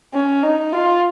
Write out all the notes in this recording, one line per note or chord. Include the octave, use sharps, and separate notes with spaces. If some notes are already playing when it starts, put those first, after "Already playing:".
C#4
D#4
F4